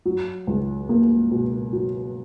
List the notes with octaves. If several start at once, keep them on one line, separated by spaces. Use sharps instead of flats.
F#3
C#2
A#3
B2
F#3